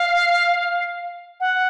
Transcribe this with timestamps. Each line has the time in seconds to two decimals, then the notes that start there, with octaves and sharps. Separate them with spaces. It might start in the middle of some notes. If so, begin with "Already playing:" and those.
Already playing: F5
1.40 F#5